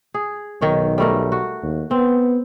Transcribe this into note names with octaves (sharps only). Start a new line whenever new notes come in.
G#4
B1 D#3 C#5
G3 A3 A#4
F#4
D#2
B3 C4